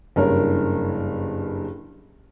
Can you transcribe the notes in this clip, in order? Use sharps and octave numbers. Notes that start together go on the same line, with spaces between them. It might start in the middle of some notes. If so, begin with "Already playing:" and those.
F#1 G2 A#4 C#5